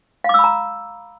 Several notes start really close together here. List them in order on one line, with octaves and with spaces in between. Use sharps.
F5 D6 E6 B5 A#5